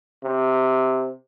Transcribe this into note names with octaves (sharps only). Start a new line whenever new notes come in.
C3